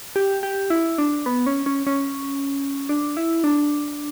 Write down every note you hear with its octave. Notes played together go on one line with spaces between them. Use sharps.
G4
G4
E4
D4
B3
C#4
C#4
C#4
D4
E4
D4